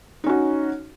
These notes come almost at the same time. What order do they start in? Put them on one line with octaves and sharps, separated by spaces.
D#4 C#4 F#4